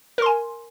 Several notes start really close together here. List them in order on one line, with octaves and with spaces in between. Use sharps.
A#4 C6 G#5